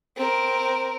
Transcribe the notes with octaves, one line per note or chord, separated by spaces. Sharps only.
C4 A#4